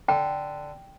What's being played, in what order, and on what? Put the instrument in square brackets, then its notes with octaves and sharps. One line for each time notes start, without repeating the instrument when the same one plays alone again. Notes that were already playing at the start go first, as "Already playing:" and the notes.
[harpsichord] D3 [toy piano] G5